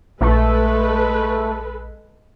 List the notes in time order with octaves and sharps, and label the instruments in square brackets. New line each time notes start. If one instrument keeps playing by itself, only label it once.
[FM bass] A#1 [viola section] G#3 A4 B4 [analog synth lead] A3